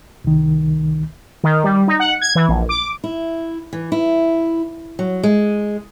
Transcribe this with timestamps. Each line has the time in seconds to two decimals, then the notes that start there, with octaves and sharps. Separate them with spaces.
0.24 C2 D#3
1.44 D#3
1.64 G3
1.88 D#4
2.00 F#5
2.21 G#6
2.35 E3
2.49 A#1
2.69 D6
3.04 E4
3.73 E3
3.92 E4
4.99 F#3
5.23 G#3